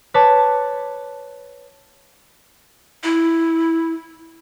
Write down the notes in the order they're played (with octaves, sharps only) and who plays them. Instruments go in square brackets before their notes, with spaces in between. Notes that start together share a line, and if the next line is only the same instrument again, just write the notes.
[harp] B4 C#5 A5 D6
[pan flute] E4